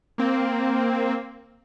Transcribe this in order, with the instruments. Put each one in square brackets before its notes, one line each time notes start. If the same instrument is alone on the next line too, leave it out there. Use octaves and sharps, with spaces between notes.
[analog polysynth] A#3 C4